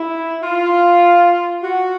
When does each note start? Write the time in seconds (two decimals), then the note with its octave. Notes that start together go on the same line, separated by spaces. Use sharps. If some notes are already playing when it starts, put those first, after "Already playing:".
Already playing: E4
0.41 F4
1.62 F#4